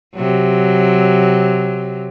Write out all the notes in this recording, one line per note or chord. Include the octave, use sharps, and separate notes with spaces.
C3 F#3